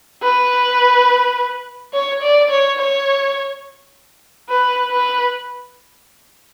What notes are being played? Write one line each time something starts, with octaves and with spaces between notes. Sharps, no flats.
B4
C#5
D5
C#5
C#5
B4
B4